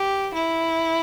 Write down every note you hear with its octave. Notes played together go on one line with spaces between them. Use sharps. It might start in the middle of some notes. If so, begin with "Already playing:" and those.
Already playing: G4
E4